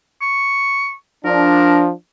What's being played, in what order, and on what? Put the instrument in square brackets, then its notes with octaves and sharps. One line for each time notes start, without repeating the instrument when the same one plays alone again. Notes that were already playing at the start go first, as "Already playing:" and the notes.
[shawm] C#6
[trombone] F3 [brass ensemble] D4 [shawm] A#4